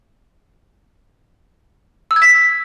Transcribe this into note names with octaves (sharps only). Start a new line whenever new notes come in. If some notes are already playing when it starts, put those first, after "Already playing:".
E6
G#6
B6